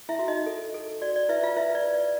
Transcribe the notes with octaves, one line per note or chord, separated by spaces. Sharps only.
E4 E5
F#4
D#4 D#5
A4
A4
F#4 D5
D5
E4 B4 E5
F4 F5
E4 B4 E5
D5
B4
D5